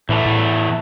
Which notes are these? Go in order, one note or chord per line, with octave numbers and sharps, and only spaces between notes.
E2 A2 E3 A3
A2